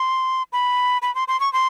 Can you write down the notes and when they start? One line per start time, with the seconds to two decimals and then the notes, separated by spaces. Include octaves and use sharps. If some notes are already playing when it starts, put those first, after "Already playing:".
Already playing: C6
0.53 B5
1.02 B5
1.15 C6
1.28 C6
1.40 C#6
1.53 C6